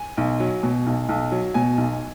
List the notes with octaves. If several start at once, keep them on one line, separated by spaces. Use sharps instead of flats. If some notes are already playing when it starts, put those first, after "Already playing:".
Already playing: G#5
B1
F#3
B2
B1
B1
F#3
B2 G#5
B1